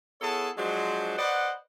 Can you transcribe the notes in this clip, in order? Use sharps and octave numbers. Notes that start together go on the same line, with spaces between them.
B3 E4 G#4 A4 C#5 A5
F3 F#3 G#3 D4 F#4 C5
B4 C5 D5 D#5 F#5